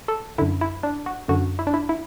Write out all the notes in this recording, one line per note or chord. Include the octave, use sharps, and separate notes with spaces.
A4
F#2 D3 E4
E4
D4
F#4
F#2 D3 F#4
E4
D4
E4
E4